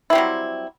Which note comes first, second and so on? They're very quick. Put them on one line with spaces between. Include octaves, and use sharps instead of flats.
E4 C4 G3 F#3